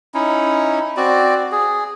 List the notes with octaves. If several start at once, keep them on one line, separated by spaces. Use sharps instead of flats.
C#4 D#4 E4
C4 F#4 D5
G#4